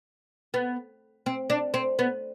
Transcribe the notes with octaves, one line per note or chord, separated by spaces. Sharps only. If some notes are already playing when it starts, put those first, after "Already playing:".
B3
C4
D4
C4
B3